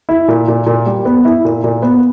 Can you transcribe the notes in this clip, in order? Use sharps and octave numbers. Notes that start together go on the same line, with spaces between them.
E4
A#2
A#2
A#2
G3
B3
E4
A#2
A#2
B3